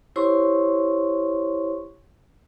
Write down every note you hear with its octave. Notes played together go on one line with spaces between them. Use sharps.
E4 G4 C5 C#5 C6 C#6